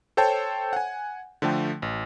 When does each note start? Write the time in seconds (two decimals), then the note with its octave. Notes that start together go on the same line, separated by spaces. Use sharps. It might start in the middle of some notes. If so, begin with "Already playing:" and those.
0.17 A4 C5 C#5 G5 A5
0.73 F#5 G#5
1.42 D3 F3 A3 G5
1.82 A1